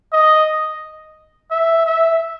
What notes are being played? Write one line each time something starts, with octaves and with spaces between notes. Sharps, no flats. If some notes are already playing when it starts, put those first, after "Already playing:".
D#5
E5
E5